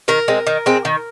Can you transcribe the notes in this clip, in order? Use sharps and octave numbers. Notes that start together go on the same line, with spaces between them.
D#3 A#4
G#3 C4
D#3
G#3 C4
D#3